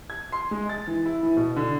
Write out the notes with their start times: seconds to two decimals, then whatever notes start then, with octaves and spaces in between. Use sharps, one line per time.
0.10 G#6
0.32 C6
0.51 G#3
0.69 A6
0.87 E3
1.06 E4
1.23 E3
1.37 B2
1.56 D3